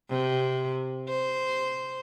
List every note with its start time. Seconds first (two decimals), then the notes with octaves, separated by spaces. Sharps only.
0.10 C3
1.09 C5